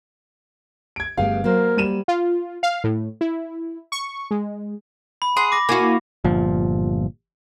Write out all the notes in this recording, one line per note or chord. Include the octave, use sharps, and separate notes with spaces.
G#6 D7
G1 G2 A3 B3 G4 G#4 F5
F#3 A#3 A#4 C5
G3 D#7 E7
F4
F5
A2
E4
C#6
G#3
B5
G#4 F#5 C6
D6 A#6
A#3 E4 F#4 G#5
G1 A#2 F3